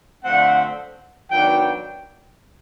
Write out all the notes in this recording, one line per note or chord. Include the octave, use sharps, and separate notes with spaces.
D3 F3 A3 C4 F#5
D#3 F#3 B3 D4 G5